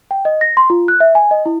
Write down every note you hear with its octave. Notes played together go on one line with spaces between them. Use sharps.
G5
D#5
A#6
C6
F4
F#6
E5
G#5
D#5
E4